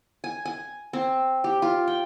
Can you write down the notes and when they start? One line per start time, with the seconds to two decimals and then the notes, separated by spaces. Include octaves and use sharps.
0.24 G#5
0.45 G#5
0.93 C4
1.44 G4
1.62 F4
1.87 G5